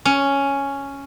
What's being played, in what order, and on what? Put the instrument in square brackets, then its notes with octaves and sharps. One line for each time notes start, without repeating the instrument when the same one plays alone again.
[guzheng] C#4